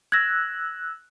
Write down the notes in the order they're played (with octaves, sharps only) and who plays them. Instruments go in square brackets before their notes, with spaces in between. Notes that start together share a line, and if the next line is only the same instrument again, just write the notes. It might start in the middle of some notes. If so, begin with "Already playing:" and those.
[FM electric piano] E6 F#6 [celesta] G#6 A#6